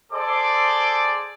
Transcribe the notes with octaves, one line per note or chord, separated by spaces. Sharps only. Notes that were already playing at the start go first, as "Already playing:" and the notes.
G#4 A4 C5 D5 C6 D6